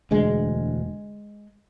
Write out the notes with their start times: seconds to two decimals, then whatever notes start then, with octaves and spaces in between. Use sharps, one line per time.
0.11 E1 D2 D3 G#3